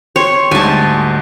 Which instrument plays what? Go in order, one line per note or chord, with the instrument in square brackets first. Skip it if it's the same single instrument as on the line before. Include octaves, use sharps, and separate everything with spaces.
[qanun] C#5 [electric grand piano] G5 C6
[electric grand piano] D2 G#2 G3 [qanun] G#5 A5